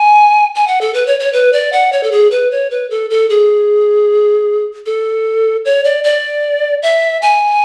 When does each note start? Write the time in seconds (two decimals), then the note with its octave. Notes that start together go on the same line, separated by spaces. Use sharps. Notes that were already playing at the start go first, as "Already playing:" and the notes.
Already playing: G#5
0.55 G#5
0.67 F#5
0.81 A4
0.94 B4
1.07 C#5
1.20 C#5
1.33 B4
1.53 D5
1.73 F#5
1.93 C#5
2.03 A4
2.12 G#4
2.31 B4
2.51 C#5
2.71 B4
2.90 A4
3.10 A4
3.30 G#4
4.86 A4
5.65 C#5
5.84 D5
6.04 D5
6.83 E5
7.22 G#5